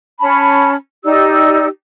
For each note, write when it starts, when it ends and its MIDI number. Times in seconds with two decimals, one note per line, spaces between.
0.20 0.75 61
0.20 0.75 81
0.20 0.75 83
1.04 1.67 63
1.04 1.67 67
1.04 1.67 74
1.04 1.67 88